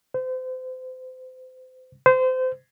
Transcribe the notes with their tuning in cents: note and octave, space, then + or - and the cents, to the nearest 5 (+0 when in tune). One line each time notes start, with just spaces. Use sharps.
C5 -35
C5 -30